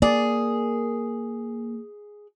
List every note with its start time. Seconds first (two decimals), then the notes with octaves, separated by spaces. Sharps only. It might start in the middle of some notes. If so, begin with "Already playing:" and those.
0.02 A#3 G#4 D5